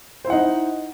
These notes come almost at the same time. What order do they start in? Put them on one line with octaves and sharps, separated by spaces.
C5 E4 F#5 D#4